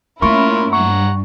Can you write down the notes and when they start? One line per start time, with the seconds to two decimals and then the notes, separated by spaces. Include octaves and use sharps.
0.22 A3 A#3 C#4 E4 F4 A#4 C#6
0.73 G2 F#5 A#5 C#6